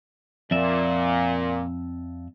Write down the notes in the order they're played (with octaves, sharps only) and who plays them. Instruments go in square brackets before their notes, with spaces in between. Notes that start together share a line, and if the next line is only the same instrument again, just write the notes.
[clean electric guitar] F2 D5 E5 [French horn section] A#2